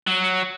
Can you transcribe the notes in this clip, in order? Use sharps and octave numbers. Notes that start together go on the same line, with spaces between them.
F#3